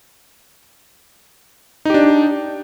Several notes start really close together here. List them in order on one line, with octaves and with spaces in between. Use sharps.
D#4 G4 D4